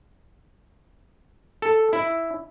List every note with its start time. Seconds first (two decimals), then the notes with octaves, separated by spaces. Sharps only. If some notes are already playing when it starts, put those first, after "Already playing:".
1.62 A4
1.93 E4